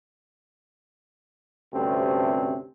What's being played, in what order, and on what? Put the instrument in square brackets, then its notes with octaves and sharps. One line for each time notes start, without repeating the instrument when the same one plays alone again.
[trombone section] D2 G2 C3 A3 C4 C#4